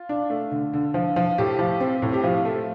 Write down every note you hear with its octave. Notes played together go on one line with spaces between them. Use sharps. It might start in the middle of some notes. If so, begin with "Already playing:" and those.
Already playing: F4
D4
A3
D3
D3
F3
F3
A2 G4
F3
C4
A2
G4
F3 F4
A3